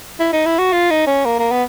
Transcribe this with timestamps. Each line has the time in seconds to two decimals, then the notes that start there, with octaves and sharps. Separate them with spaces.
0.20 E4
0.33 D#4
0.46 E4
0.59 F#4
0.73 F4
0.91 D#4
1.07 C#4
1.25 A#3
1.39 A#3
1.51 B3